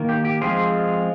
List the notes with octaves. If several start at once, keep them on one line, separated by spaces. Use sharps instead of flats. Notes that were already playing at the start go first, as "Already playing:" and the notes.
Already playing: D#3 A#3
G4
G4
F3 G#3 C4 F4 G#4